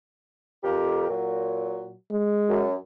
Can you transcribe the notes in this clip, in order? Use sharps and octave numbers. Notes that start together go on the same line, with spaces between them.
F2 G4 A#4
A#2 F#3
G#3
F#2